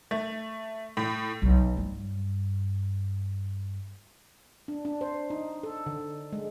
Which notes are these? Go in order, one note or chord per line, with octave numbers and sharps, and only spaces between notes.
A3
A2
B1
G2
D4
D4
C5
D#4
A4
D3
G#3